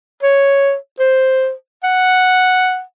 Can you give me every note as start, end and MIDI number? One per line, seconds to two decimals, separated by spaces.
0.23 0.75 73
1.00 1.52 72
1.84 2.82 78